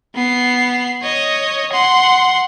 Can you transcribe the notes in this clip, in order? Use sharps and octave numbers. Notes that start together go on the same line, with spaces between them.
B3 C7
C#5 D#5
F#5 C6